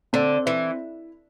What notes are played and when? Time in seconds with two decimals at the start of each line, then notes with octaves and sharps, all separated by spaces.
0.13 D3 C4
0.46 E3 E4